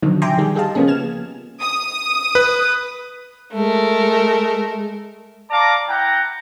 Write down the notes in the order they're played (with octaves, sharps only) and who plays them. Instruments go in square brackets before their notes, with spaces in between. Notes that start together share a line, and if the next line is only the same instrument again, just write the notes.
[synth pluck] B2 D3 D#3 F3 F#3 D#4
E5 G5 G#5 A#5 C6 D6
D#3 G3 G4 G#4
G4 G#4 D#5 F5 A5
C#3 F3 A#3 B3 C#4 G#4
F6 G#6 E7
[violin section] D#6
[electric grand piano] B4
[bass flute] G#3 [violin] A3 A#4
[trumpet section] D5 F5 A5 A#5 D6
E4 F#5 G5 A#5